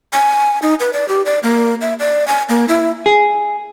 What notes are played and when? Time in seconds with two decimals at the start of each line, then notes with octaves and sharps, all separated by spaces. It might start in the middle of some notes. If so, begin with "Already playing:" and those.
0.13 G#5
0.62 D#4
0.80 B4
0.93 D5
1.08 G4
1.26 D5
1.43 A#3
1.81 E5
2.00 D5
2.28 G#5
2.49 A#3
2.69 E4
3.06 G#4